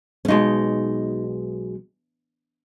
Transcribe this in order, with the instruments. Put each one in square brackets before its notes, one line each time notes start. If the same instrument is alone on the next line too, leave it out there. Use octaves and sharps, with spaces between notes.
[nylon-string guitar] C#4
[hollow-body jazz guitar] B1 B2 G#3 [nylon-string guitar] D#4